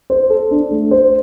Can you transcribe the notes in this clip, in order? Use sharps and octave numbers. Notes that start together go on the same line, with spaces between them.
C5
A4
D4
A3
C5